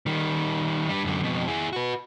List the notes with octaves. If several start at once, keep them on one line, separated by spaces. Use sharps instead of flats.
D#3 G3
G3 D4
F#2 D3
F2 B2
E4 G#4
F#4 B4